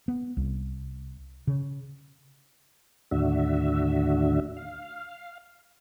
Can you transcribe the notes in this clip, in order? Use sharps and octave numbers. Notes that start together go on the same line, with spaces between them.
B3
C2
C#3
D#2 A2 D3 D4 F#4 E5
F5